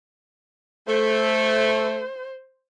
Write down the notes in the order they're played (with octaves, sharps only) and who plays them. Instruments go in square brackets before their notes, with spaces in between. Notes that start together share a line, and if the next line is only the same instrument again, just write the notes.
[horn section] A3 [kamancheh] C5